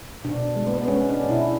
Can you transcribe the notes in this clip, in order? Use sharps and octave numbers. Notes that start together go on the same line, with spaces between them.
B2 D4
G#3
B3
B3
G#3 C#4
D4
B2
E4